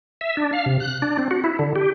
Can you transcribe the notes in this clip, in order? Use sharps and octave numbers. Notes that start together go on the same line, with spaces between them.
E5
D4
F5
C3
F#6
D4
C4
F#4
E4
D3
G4